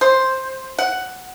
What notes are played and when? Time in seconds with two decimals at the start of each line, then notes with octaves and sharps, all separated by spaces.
0.01 C5
0.79 F#5